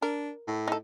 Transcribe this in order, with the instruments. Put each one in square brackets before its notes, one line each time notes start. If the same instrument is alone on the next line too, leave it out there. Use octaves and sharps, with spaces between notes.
[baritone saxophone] D4 [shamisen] A#4
[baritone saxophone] A2
[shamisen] D#4 A4